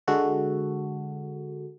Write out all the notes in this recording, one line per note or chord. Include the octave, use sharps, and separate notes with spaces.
D3 G#3 F#4 A4